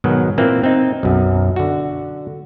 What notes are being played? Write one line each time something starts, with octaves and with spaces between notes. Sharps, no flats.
G#2 B2 D#3 F#3
A#2 E3 A#3 C4
C4 D#4
B1 F#2
D3 F#4